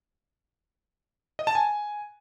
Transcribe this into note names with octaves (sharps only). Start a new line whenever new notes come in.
D#5
A5
G#5